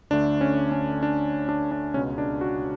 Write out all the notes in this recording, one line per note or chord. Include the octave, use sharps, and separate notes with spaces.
D2 D3 A3 D4
C#4
C#4
D4
D4
D4
C#2 B2 G#3 C#4
D4
F#4